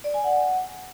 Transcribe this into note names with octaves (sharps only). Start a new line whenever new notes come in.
D5
G#5
F#5